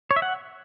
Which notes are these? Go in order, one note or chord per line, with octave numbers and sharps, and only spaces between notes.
C#5
E5
F#5